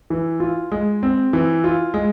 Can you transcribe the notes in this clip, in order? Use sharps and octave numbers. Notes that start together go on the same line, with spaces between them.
E3
F4
G#3
C4
E3
F4
G#3